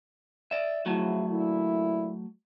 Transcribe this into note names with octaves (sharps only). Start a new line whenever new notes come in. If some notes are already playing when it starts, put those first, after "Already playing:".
D5 E5
C#3 F3 F#3 A3 E4 F#4
A#2 D3 E4